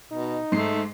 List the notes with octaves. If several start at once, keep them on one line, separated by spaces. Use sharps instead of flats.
B2 D#4
G#2 A3 C7